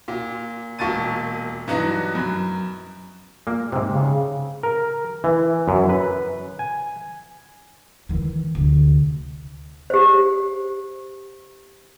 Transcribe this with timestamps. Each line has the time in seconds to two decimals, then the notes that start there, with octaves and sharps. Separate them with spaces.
0.08 A#2
0.79 E1 A#2 A5 C#6 A6 D#7
1.68 G2 E3 F#3 D#4 F#4
2.15 F#2 B5
3.47 A#2 A#3
3.72 G#2 C3
3.91 C#3
4.63 A#4
5.24 E3
5.68 F#2
5.89 B4
6.59 G#5
8.09 D#3 E3
8.55 D2 C3
9.90 G4 C5